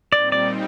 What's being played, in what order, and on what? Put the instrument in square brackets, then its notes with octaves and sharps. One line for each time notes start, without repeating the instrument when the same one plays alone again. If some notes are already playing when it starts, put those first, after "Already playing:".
[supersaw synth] A#2 G3 C4 D#4 [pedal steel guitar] D5
[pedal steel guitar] D5